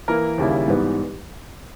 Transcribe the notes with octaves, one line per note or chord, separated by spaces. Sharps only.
E3 A#3 E4 A#4
D#2 C#3 G3 A#3 E4
G#2 E3 G3 B3